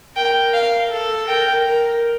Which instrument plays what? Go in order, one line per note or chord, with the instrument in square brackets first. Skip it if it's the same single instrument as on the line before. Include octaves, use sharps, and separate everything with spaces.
[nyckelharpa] A#4 [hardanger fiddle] G5
[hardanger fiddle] F5
[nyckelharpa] A4
[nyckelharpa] A#4 [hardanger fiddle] G5
[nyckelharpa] A#4